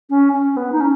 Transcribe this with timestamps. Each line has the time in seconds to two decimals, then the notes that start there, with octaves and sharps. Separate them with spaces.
0.10 C#4
0.33 C#4
0.56 B3
0.72 D#4
0.80 C#4